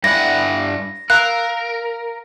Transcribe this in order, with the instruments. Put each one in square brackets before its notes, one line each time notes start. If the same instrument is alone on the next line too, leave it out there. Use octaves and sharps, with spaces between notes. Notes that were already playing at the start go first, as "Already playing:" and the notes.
[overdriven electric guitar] G2 F#5 [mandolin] E4 D5 [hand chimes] A#6
[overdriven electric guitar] A#4 [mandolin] F5 A#5 E6 [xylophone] F#6